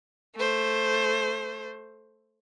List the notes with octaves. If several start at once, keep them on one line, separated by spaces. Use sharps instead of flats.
A3 C5